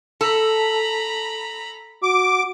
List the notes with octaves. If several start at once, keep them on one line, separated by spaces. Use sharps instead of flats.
A4 A#5 B5
F#4 D6